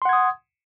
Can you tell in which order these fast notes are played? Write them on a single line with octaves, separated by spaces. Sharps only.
C6 F#5 G#6 D#6